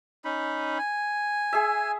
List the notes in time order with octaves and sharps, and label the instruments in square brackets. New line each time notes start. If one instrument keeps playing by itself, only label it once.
[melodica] C#4 D#4 B5
G#5
[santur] G#4 E5